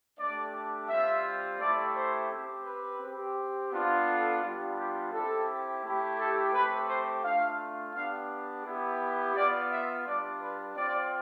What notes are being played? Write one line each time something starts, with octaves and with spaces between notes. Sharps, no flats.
A3 D4 G4 D5
G3 C4 F4 E5
A3 E4 G4 D5
C5
C4 G4
B4
C4
G4
B3 D4 F4
A4
G3 B3 D4 F4
G4
C4 E4 G4 A4
A3 E4 G4
A4
A3 C4 G4 B4
C5
A3 D4 F4 F5
B3 D4 G4 F5
B3 E4 G4
B3 F4 D5
E5
G3 D4 F4 D5
B4
C4 F4 D5